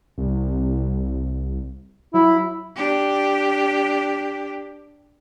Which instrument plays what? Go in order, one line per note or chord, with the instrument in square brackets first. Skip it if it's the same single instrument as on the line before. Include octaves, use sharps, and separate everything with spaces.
[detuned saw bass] C2
[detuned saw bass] F#3 [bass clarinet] E4
[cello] D4 G4